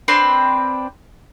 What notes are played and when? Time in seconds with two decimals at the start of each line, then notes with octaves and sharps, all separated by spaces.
0.08 C4 D4 B4 C6